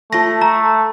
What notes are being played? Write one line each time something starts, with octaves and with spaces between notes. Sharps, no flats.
A3 F4 A5 A#6
A#5